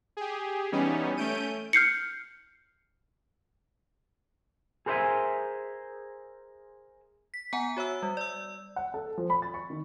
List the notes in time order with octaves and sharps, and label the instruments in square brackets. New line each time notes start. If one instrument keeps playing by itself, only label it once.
[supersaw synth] G4 G#4
E3 G3 B3 C#4 D#4
A3 C#4 G6 D7 D#7
[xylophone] F6 G6 C7 C#7
[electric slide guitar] G#4 A#4 C5 D5 E5 G#5
[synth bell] B6
B3 F#5 G#5 A#5
F#4 C#5 E5 E6
G3
D5 E6
[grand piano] F#5
A4
F3
B5
A6
C#6
D#3